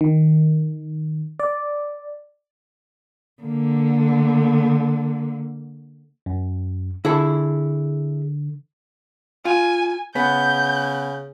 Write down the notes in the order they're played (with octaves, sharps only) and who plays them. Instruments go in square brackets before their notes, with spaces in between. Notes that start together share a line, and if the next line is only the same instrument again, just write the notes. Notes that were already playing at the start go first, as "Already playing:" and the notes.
[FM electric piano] D#3
D5
[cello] D3 A#3
[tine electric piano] F#2
[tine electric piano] D3 [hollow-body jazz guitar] E4 G#4 A4
[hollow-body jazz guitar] F4 [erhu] G#5
[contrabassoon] C#3 [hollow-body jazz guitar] B3 [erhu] G6